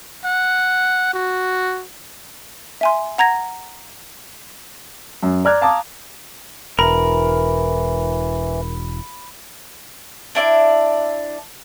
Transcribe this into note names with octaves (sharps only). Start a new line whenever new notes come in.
F#5
F#4
E5 G#5 C6
F#5 A#5 G#6 A#6
F#2
D5 A#5 F6 F#6 G#6
F5 A5 A#5 D6 D#6
E1 E3 A#4 A#5 B5
D4 E4 D5